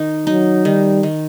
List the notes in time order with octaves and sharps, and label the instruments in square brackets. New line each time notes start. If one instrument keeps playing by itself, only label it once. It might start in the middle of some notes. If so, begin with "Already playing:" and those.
Already playing: [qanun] D#3 D#4
[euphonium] F#3 [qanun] D#4
[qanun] D#3 [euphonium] G3
[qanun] D#3